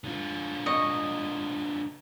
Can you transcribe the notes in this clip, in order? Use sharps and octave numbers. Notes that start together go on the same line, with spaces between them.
D3 F4
D#5 C#6